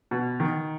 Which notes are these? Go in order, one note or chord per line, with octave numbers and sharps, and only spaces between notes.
B2
D#3